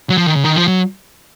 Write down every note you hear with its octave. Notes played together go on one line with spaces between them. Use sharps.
F#3
F3
D#3
C#3
D#3
F3
F#3